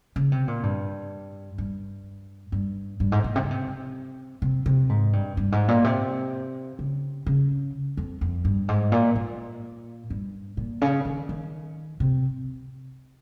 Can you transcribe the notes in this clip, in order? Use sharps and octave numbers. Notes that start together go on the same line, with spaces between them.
C#3
C3
A#2
G2
G2
G2
G2
G#2
A#2
C3
C#3
C3
C3
C3
G#2
G2
G2
G#2
A#2
C3
C#3
C#3
F2
F2
G2
G#2
A#2
A#2
G2
A#2
C#3
D#3
D#3
C3